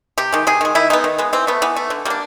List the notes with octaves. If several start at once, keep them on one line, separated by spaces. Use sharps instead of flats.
C3 G4
D#3 G#3
C3 G#4
D#3 G#3
D#3 E4
G#3 B3 D#4
D#3
G#3 B3
E3 C4
A3 B3
E3 B3
A3
D3
G3 A#3 D4